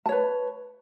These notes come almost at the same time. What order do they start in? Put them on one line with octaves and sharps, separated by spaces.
A5 C#5 B4